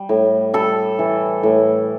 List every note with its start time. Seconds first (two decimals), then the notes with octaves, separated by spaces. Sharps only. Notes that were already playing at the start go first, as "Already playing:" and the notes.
Already playing: G3
0.09 A2
0.54 G3 A4
0.99 E3
1.43 A2